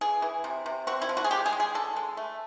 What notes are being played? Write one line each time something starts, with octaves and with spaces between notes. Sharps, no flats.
E3 G#4
E3
C3
C3
C4 F#4
E4
F3
F#4
G#4
G#3 G4
G#4
G#3
G#4
D3 A4
G#3
A3